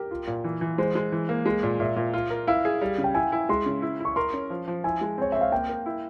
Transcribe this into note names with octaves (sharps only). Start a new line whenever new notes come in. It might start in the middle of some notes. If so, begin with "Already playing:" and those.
Already playing: G4 A#4
F4
A#2
E3
E3
G#3 C5
G#3
E3
A#3
G#3
A#2
A#2 E5
A#2
F4
A#4
E4 F5
G#4
G3
C#3
G5
E4 G#5
E4
G#3 C6
C#3
E4
E4
C#6
A#4 C6
C#4
F3
F3
E4 G#5
G#3
C4 C#5
C4 E5
F5
A#3 G5
A#4
E4